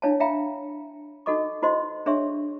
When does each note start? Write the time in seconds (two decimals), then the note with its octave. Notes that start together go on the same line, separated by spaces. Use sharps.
0.02 D4 E4 C#5 F5 G#5 A5
0.20 E5 F5 G5 A#5 B5
1.26 D#4 F#4 A4 D#5 C#6 D6
1.62 E4 F#4 C5 D#5 C6
2.06 D4 G#4 C#5 E5 C6 C#6